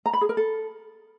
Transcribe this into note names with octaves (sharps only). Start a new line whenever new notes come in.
A#5
B5
G#4
A#4
A4